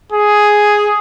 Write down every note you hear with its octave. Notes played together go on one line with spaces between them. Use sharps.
G#4